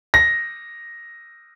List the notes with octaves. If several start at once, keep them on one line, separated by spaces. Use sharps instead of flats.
A#6